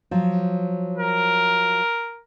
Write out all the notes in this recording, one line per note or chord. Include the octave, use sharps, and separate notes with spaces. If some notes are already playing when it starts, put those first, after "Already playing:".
F3 F#3
A#4